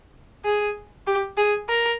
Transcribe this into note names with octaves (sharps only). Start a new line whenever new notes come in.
G#4
G4
G#4
A#4